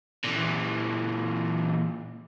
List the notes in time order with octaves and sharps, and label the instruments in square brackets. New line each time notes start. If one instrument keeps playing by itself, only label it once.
[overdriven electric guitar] A#2 E3